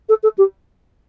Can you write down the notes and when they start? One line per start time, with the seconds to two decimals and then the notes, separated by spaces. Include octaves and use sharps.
0.09 A4
0.23 A4
0.38 G4